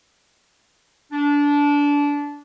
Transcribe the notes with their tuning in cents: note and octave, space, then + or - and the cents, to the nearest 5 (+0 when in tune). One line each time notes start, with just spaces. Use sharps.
D4 -20